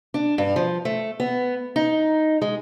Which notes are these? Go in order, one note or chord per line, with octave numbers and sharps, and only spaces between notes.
D4
G2
F3
A3
B3
D#4
G#3